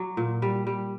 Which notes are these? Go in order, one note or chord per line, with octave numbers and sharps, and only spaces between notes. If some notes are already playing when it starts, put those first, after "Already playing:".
Already playing: F#3 D5
A#2
G3
G3